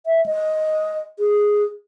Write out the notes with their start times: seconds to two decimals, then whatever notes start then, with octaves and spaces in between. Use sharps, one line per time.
0.06 E5
0.26 D#5
1.19 G#4